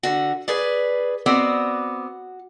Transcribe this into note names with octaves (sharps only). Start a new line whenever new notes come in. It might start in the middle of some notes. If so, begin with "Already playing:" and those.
D3 F#4
G#4 B4 D5
B3 C4 F#4 D5